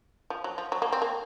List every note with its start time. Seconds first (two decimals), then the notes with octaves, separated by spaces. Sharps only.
0.30 F3
0.44 F#3
0.58 F3
0.72 F#3
0.82 A#3
0.92 C4
1.02 A#3